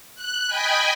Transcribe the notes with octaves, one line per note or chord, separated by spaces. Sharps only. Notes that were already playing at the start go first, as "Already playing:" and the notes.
F#6
D#5 G5 G#5 B5